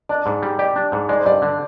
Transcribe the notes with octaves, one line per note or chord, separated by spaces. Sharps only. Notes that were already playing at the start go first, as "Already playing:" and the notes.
D4 D5
G#2
G3
G4 D5
D4
G#2
G#3 D5
C5
G2 D5
D3